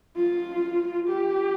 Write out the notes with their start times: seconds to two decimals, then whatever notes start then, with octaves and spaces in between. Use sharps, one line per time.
0.16 F4
1.09 G4